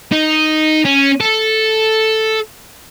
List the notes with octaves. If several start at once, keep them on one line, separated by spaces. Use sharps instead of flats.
D#4
C#4
A4